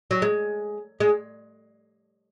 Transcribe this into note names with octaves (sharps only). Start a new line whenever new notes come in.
F#3
G#3
G#3